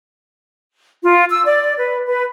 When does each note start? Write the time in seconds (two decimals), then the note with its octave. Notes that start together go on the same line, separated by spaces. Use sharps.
1.02 F4
1.29 E6
1.45 D5
1.78 B4
2.07 B4